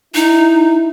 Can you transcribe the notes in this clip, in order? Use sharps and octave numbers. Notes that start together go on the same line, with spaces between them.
D#4 E4